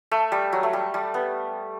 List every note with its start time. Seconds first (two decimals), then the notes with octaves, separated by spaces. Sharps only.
0.11 A3
0.32 G3
0.53 F#3
0.63 A3
0.73 G3
0.94 G3
1.14 B3